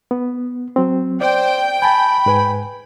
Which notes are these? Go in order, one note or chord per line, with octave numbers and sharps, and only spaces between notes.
B3
F#3 C4
C5 D5 G5
G#5 A5 B5
G#2 B4 G#5